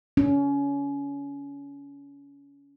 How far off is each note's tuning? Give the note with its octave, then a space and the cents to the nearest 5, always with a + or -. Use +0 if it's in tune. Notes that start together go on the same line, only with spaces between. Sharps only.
C#4 +25